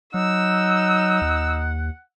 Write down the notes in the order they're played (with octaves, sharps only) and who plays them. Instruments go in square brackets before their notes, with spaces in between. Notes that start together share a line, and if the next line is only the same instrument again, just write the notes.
[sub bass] F#3 [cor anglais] D#4 [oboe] F#5 [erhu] E6
[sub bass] D#2